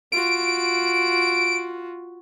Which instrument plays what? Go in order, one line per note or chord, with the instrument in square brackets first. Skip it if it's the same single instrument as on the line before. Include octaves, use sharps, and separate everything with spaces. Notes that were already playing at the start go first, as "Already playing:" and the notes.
[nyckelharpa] F4 F#4 [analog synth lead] D7